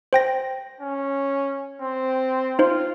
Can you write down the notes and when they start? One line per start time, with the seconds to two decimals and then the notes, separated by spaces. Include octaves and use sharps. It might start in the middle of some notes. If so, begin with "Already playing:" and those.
0.13 C5 G5 A#6
0.81 C#4
1.81 C4
2.59 D#4 F4 C5